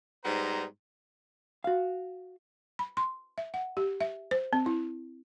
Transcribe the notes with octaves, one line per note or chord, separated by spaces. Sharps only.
G#2 G3 B3 C5 A#5
F#4 F5
B5
C6
E5
F#5
G4
E5
C5
C4
E4